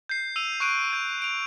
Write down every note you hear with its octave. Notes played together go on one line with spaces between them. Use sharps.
G6 C7
E6 D#7 F7
C#6 F#6 D7 D#7
G6
D7 F7